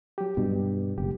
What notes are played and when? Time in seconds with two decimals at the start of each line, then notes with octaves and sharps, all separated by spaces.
0.18 F#3 G4
0.37 G2 B2
0.98 F#1 G4